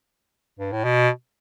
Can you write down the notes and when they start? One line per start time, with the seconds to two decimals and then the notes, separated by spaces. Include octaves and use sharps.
0.59 G2
0.72 A2
0.84 B2